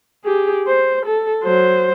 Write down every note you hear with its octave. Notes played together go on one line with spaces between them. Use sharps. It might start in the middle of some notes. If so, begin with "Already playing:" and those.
G4 G#4
C5
A4
F#3 C5